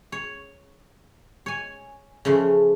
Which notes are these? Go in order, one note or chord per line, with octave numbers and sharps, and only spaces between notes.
C#5
C#5 G#5
C#3 E3 F3 A3